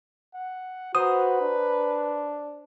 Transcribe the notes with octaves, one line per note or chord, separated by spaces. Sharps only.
F#5
F#4 B4 C5 A#5 D#6
D4